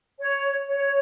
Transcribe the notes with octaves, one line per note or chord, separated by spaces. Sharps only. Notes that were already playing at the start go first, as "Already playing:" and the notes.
C#5
C#5